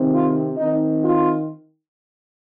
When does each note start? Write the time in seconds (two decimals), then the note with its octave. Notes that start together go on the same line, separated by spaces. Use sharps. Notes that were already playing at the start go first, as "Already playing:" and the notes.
Already playing: C3 D#3 C4
0.12 F4
0.57 D#3 C4 D#4
1.01 F4